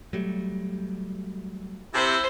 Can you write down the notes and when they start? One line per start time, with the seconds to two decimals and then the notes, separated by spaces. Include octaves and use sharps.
0.13 F#3 G3 A3
1.94 C3 E4 C5